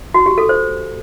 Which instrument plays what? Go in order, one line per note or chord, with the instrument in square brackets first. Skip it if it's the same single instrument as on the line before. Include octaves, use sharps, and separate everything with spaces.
[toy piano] F#4
G4
A4
C5